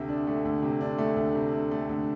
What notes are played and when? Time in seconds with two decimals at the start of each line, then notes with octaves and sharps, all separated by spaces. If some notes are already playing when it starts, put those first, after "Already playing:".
Already playing: D2 C3 A3
0.08 D4
0.27 A3
0.45 D2
0.62 C3
0.81 D4
0.98 A3
1.16 D2
1.35 C3
1.53 D4
1.71 A3
1.89 D2